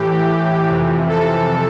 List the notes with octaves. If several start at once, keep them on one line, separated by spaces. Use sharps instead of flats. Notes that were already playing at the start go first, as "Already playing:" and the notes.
Already playing: A2 E3 G4
F2 C3 E3
A4